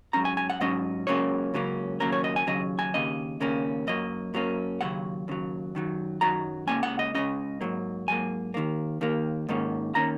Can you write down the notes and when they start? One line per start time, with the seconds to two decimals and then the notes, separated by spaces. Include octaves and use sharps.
0.13 G#2 F#3 C#4 A#5
0.25 G#5
0.37 G#5
0.50 F#5
0.61 G#2 F#3 C#4 D#5
1.07 C#2 C#3 F#3 A#3 C#4 C#5
1.54 C#2 C#3 F#3 A#3 C#4
2.00 D#2 C#3 F#3 A#3 C#4 A#4
2.12 C#5
2.24 D#5
2.36 G#5
2.47 D#2 C#3 F#3 C#4 D#5
2.79 G#5
2.94 D#2 C#3 A#3 C#4 D#5
3.40 D#2 C#3 A#3 C#4
3.87 F#2 F#3 A#3 D#5
4.34 F#2 F#3 A#3 C#4
4.81 D#2 C#3 F#3 F#5
5.28 D#2 C#3 F#3
5.75 F#2 D#3 F#3
6.21 F#2 D#3 F#3 A#5
6.67 C#2 C#3 A#3 C#4 G#5
6.83 F#5
6.99 D#5
7.14 C#2 C#3 A#3 C#4 D#5
7.61 G#2 F#3 A#3
8.08 G#2 F#3 A#3 G#5
8.54 D#2 D#3 A#3
9.01 D#2 D#3 A#3
9.49 G#2 D#3 A#3 C#4
9.95 D#3 A#3 C#4 A#5